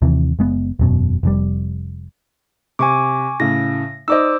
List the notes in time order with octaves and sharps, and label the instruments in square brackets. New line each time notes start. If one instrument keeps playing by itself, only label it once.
[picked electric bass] D#2 C3 E3
F#1 G#3 B3
E1 F#2 B2
F1 F2 G3
[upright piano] C3 [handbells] G#5 C#6 D6
[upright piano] A2 C#3 [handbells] A#6
[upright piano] D#4 D5 D#5 [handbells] C5 D6 E6